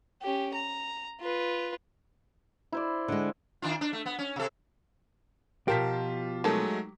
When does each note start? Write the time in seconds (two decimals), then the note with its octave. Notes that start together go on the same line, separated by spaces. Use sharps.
0.22 C#4 G4
0.54 A#5
1.20 F4 B4
2.72 E4 C5 D5
3.08 D3 G#3
3.62 D#3 D4 F4
3.81 D4
3.93 A3
4.06 B3
4.19 C#4
4.36 C3 A4
5.68 B2 F3 F4 G4 A#4 A5 B6
6.44 D#3 F#3 G#3 A3 A4